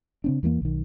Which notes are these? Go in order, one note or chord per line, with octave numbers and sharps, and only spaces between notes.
C#3 C4 D4
E2 E3 A3 A#3
B1 D#3